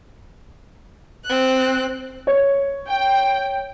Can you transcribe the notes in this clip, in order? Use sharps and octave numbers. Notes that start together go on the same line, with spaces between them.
C4 F#6
C#5
G5